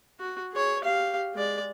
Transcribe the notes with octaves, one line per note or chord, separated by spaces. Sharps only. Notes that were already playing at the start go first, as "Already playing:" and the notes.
F#4
G#4 C#5
G4 F5
G#3 D5